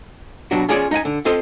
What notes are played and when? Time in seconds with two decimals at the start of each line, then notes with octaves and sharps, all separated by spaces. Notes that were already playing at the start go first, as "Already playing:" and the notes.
0.51 B2 F#3 G3 D4 F#4
0.69 C#4 F4 G#4 C#5 D5
0.91 D#4 D#5 F#5 G#5
1.05 D3
1.25 C4 F4 A4 C5 D#5